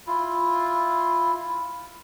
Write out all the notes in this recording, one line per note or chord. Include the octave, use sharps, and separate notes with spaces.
E4 F4